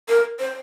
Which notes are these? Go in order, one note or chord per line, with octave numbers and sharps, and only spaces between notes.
A#4
C5